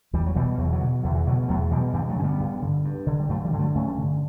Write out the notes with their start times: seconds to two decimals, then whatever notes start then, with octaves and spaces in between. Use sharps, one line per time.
0.13 E2 E3 G3
0.26 F#3
0.35 B2 E3 G3
0.58 E2 F#3
0.65 E3
0.73 D3 F#3
0.80 B2
1.03 E2 D3
1.15 E3
1.26 B2 D3 F#3
1.43 G3
1.48 E2 F#3 A3
1.71 B2 E3 G3
1.93 G2 E3 G3
2.08 F#3 A3
2.16 D3 C#4
2.24 G3 B3
2.40 G2
2.62 D3
2.85 G2
3.07 D3
3.20 G3
3.29 G2 F#3 A3
3.44 E3 G3
3.53 D3
3.59 F#3 A3
3.75 G2 A3 C#4
3.98 D3